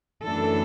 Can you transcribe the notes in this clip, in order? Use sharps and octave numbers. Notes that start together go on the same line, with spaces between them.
F#2 E3 A3 D4 A4